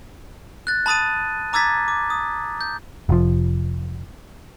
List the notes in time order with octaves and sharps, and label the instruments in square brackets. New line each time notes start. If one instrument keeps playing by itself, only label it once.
[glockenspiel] F#6 A6
A5 B5 D#6 A6 D#7
A#5 D6 E6 G#6 A6 B6
D6
D#6
G6
[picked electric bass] F1 F3